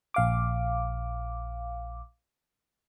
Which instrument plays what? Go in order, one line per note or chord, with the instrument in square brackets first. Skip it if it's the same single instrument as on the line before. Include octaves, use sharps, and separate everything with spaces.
[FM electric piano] A#1 F5 D6